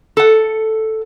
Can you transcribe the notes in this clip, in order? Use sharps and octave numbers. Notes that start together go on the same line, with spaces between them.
A4 F#5